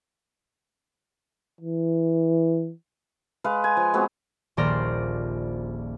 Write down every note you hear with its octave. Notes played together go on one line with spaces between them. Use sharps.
E3
G#3 B4 F5
G#5
F3
G#3 B3 C4 F#4
D#1 A#1 C5 D5 A#5 F6